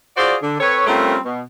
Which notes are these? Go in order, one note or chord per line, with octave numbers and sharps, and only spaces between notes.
F4 F#4 G#4 C5 D5
D3
C4 A4 B4 C#5
G3 A3 C4 C#4 F4 A#4
B2